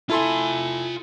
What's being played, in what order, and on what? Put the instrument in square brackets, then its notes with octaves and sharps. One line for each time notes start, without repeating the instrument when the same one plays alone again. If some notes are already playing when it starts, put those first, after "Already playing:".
[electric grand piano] E4 A4 C6 [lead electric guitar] F4 G#5